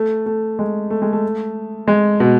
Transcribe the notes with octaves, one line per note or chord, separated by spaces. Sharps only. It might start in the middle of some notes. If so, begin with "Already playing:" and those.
Already playing: A3
A3
G#3
A3
G#3
A3
G#3
B2